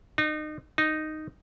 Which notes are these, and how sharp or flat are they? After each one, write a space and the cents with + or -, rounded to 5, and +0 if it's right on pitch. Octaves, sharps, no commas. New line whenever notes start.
D#4 -30
D#4 -5